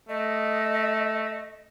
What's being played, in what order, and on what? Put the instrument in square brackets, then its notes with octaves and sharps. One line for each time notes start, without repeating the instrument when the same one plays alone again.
[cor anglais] A3 [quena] D#5